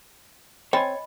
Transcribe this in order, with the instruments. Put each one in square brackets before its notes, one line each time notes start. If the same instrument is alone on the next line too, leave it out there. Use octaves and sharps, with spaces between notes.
[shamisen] C4 [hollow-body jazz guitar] C#5 G#5 [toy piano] D#5 G5 B5